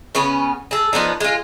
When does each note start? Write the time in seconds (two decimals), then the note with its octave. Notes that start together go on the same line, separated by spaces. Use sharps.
0.15 C#3 B3 C#4
0.71 G#4 A4
0.93 F3 B3 D4 D#4
1.20 G#3 F4